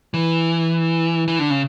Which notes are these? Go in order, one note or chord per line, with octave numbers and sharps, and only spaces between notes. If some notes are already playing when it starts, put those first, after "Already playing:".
E3
E3
D3
C#3